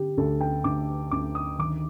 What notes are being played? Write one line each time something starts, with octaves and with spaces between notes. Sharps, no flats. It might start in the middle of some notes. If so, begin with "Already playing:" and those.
Already playing: D3 G4
D2 A4
G5
D2 D6
D2 D6
D#6
D#3 D6